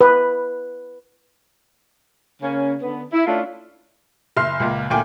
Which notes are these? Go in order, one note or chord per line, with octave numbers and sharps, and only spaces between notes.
B4
C#3 A#3 C#4
D3 B3
E4
A3 C#4 D4 E4 F4
F#1 E5 C6 F6 C7
C#2 A#2
D2 A#2 G5 G#5